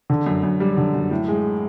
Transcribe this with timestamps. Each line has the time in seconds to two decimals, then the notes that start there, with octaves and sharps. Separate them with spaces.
0.10 D3
0.26 F#2
0.43 F#2
0.60 G3
0.77 D3
0.94 F#2
1.11 A2
1.28 G#3